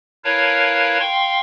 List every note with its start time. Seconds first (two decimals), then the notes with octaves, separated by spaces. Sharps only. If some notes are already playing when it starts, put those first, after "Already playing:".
0.24 E4 A#4 B4 C#5 F5 A5
1.00 F5 G5 C6 C#6